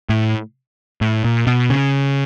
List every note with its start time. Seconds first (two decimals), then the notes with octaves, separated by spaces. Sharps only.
0.09 A2
1.01 A2
1.24 A#2
1.47 B2
1.70 C#3